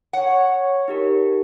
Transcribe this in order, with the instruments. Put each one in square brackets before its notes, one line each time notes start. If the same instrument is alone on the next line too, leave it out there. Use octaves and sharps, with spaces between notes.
[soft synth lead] C#5 [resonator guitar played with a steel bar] F#5
[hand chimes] D#4 G4 A#4